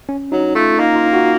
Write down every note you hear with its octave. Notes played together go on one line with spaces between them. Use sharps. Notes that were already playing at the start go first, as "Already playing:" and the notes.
C#4
F#3 D#4
A3 F4
A#3 D#4
F4
F#4